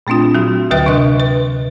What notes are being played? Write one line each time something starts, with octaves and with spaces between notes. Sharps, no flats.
A#2 A3 C4 D4 F4
F#3 F#4
D2 D3 F#3 B4 E5 G5
C3 D4 D#5 F#6
B4